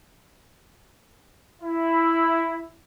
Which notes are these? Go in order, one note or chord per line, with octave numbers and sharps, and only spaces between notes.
E4